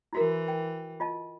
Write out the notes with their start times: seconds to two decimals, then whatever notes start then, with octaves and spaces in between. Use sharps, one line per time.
0.13 E3 E4 F#4 A#4
0.48 G5
1.00 F4 D#5 A5